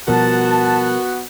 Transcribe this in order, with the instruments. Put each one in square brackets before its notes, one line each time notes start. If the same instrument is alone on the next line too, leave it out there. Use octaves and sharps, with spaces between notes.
[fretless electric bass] B2 F3 G3 [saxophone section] B3 F#4 [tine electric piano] A#4 [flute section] A5